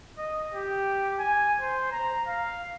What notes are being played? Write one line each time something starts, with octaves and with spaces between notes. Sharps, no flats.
D#5
G4
G#5
C5
A#5
F5